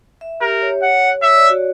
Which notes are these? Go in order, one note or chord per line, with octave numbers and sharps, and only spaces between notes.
E5
G4 A#4
C#5
F#5
C#5 E5
D5
F#4